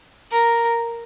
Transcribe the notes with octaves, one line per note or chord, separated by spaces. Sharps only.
A#4